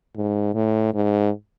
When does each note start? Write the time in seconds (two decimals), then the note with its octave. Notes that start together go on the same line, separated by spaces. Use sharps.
0.15 G#2
0.54 A2
0.94 G#2